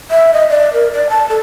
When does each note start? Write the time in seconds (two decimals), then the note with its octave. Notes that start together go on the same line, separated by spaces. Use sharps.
0.11 E5
0.33 D#5
0.49 D5
0.73 A#4
0.93 D5
1.10 A5
1.30 A4